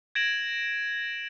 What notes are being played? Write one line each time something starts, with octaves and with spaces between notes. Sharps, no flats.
G#6 A#6 D7 E7 F#7